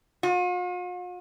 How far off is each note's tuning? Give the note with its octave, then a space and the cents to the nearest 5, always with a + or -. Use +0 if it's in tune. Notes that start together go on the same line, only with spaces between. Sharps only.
F4 +45